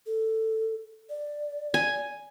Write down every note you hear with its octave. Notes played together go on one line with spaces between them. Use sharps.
A4
D5
G#5